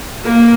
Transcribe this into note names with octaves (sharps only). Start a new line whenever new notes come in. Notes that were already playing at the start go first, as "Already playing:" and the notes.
A#3